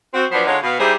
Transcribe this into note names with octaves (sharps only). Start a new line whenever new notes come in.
C4 F#4
F3 F#3 B3 D4 B4 C5
D3 G#3 D#4 F4 C#5 F#5
B2 B3 F5
G3 D#4 E4 G4 G#4 C5